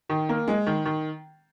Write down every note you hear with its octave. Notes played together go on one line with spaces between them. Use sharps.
D#3
A#3
G#3
D#3
D#3